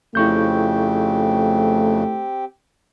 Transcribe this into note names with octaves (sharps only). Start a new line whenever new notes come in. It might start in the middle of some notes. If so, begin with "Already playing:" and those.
F2 C#3 A3 C4 E4 G4 C#6 G6